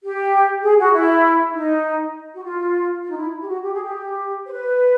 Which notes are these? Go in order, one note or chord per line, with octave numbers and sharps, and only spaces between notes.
G4
G#4
F#4
E4
D#4
F#4
F4
F4
D#4
E4
G4
F#4
G4
G#4
G4
C5
B4